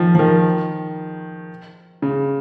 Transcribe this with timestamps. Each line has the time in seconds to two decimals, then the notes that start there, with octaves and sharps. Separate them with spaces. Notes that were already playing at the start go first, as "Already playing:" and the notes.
Already playing: D#3 F3
0.15 F3
0.19 D#3
2.02 C#3